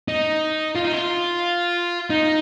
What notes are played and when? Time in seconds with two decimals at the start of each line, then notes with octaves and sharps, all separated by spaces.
0.08 D#4
0.76 F4
0.85 D#4
0.93 F4
2.10 D#4